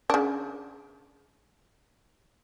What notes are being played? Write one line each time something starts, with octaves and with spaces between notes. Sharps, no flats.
C#3 D4